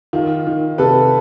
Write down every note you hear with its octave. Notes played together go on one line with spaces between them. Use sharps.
D#3 F4
D#3
C3 A4 B4